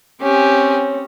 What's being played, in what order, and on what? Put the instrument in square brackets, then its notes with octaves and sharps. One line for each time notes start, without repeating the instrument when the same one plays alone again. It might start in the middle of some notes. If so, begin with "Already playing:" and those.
[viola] C4 C#4 [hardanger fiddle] G4 G#5 [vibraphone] C#5